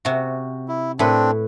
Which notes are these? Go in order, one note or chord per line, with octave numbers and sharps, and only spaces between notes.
C3 F#4
E4
A2 C4 D4 B4